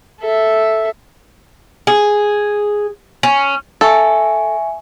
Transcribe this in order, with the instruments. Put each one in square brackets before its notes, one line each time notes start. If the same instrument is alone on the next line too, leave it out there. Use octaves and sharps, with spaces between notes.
[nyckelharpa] A4 E5
[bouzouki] G#4
C#4
[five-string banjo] A4 [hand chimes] E5 G#5 C#6